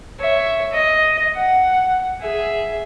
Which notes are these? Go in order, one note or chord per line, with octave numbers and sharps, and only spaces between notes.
C#5 E5
D#5
F#5
G#4 E5